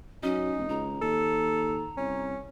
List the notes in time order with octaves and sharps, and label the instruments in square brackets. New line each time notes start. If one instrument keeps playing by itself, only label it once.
[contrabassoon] F#3 [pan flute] C#4 [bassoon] D#4
[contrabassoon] F1
[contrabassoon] C#2 [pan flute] A#5
[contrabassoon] D#2 [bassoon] A4
[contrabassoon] C2 [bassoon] C#4